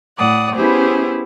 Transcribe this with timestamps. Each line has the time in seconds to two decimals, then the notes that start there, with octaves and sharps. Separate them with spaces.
0.18 A2 D5 F#5 D#6
0.54 B3 C#4 E4 G4 G#4 C5